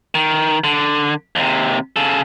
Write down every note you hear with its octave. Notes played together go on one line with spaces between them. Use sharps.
D#3
D3
D#2 C3
C#3 A4